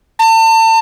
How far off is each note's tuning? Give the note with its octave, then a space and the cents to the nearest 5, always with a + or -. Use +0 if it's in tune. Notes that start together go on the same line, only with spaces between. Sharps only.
A5 +35